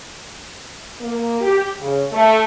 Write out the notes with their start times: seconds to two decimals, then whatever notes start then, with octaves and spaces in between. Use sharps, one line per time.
1.01 A#3
1.41 G4
1.80 C#3
2.12 A3